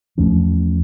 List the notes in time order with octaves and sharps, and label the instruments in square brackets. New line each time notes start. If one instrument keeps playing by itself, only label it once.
[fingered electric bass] E2 F3 A3 C#4